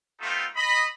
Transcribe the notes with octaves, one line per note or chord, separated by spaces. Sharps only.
A3 B3 C4 D#4 F4 A4
D#5 B5